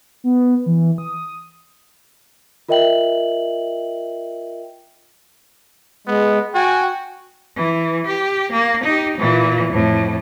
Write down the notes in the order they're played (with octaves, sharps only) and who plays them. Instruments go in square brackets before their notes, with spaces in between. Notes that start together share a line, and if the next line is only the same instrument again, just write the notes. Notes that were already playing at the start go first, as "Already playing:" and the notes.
[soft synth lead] B3
E3
D#6
[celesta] F4 A#4 D#5 E5 G5 F#7
[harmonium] G#3 [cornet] B3
[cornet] F#4 [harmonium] G5 G#5
[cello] E3
G4
A#3
D#4 G4
A#2 E3
F2 A2